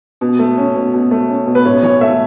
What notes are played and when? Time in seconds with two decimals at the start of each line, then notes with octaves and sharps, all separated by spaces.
0.21 B2
0.39 A3
0.57 C#4
0.75 B2
0.93 B2
1.11 A3
1.30 C#4
1.46 B2
1.55 B4
1.65 A2 C#5
1.83 E3 C#5
2.01 A3 E5